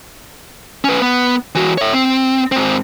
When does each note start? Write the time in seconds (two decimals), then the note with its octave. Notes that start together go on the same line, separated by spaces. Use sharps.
0.84 C#4 B4
1.02 B3
1.55 E3 F#4
1.78 C#5 E5
1.93 C4
2.52 G#2 C4